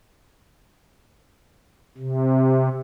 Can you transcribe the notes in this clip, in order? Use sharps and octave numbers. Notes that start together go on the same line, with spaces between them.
C3